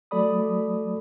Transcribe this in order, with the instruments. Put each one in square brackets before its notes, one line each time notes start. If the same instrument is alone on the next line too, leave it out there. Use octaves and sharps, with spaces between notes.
[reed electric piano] F#3 A3 A4 D5 B5 D#6